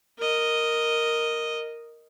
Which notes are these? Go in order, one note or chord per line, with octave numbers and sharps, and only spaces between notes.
A#4 D#5